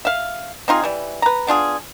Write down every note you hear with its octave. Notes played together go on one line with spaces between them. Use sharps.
E5 F5
C4 D#4 F4 G#4
E3 G3
B4 A#5
B3 D4 F4 G#4